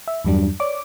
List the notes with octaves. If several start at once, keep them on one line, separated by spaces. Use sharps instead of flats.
E5
E2 G2 F#3 G3 D4
C#5 D5 D6